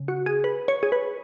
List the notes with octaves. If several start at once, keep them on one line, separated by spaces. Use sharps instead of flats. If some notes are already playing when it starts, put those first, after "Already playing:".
Already playing: C#3
F#4
G#4
B4
C#5
G#4
B4